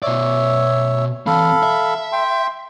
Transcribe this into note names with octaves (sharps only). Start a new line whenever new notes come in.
B2 C#5 D5 E5
E3 C4 A4 F5 B5
E5
G5 C6